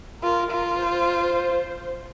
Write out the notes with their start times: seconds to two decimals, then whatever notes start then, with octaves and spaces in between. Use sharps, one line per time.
0.23 F4 A#4
0.51 F4
0.81 C5